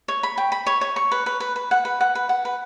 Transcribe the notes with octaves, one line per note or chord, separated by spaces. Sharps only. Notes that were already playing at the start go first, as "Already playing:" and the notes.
C#5
B5
G5
B5
C#5
C#5
C#6
B4
B4
B4
B4
F#5
B4
F#5
B4
F#5
B4